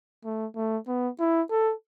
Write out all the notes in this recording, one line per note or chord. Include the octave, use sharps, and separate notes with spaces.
A3
A3
B3
E4
A4